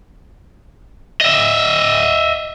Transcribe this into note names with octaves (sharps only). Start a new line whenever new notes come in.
D#5 E5